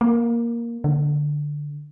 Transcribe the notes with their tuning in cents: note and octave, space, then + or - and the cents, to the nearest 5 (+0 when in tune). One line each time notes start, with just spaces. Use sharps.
A#3 +5
D3 +5